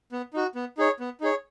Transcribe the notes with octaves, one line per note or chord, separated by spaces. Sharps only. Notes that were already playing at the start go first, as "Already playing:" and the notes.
B3
D#4 F#4
B3
D#4 G#4 C#5
B3
D#4 G#4 C#5